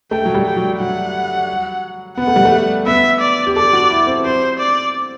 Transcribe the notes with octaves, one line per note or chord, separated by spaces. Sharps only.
A3 G5
F#3
G3
G5
F#3
F#3 F#5
B3 F#5
A3
G3
A3
B3 E5
D5
G4
A4 D5
F#4
E4
C4
C4 C5
D5